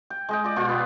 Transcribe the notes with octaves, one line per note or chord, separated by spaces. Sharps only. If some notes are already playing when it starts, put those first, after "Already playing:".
G5
G#3 D#5 G5
F4 D5
B2 F4 G4 D5
B3